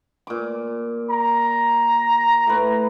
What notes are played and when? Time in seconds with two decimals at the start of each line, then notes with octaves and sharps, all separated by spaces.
0.27 A#2 D6
1.10 A#5
2.47 A2 B4